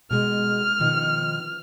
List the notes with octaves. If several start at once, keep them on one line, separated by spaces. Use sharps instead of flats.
B2 G#3 F6
B2 D#3 F3